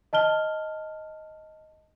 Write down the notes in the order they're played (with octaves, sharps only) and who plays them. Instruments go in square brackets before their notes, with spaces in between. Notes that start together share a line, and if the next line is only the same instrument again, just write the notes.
[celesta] D#5 A5 F6 G7